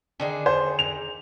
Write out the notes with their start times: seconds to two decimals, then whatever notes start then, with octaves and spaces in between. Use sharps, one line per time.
0.20 D3 D#3 G#4
0.46 C5
0.79 F7